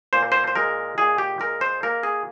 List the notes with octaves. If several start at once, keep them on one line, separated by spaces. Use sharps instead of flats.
A#2 C5
C5
C5
G#3 A#4
A#2 G#4
G4
G#3 A#4
C5
A#3 A#4
G#4